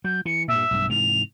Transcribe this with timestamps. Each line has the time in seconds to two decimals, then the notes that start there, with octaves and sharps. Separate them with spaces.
0.04 F#3 G6
0.25 E3 C#7
0.48 G2 A#2 E5
0.71 B1 G2
0.90 G#2 C3 E3 F7